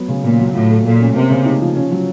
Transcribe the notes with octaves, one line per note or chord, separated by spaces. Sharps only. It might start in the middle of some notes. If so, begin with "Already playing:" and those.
Already playing: F#3 B3
C#3
A#2 C#3
F#3
A2 F4
A3
A#2 A3
C#4
C3 A#3
C#3
D#4
F3
C#4
F#3